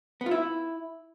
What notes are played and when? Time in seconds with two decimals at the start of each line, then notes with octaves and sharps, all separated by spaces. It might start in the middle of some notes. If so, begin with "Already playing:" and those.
0.21 B3
0.26 F4
0.31 E4